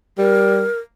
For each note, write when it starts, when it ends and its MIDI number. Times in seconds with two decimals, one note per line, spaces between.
0.18 0.65 55
0.18 0.79 70